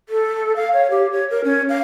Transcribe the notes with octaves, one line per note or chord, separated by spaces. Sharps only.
A4
F5
C#5
G4
C#5
A#4
C#4
F5